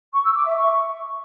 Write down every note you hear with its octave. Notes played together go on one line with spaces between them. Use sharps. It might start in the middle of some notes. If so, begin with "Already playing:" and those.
C#6
E6
D6
E5
C#6